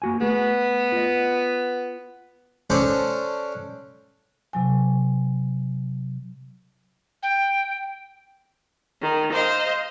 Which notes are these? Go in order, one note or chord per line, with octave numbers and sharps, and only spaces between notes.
A#3 F#4 G#5
A3 B3 G#4
F4 D#5
C#4 D4 A4 C5 D5
C3 F#3 G#5
G5
D#3
C5 D#5 F5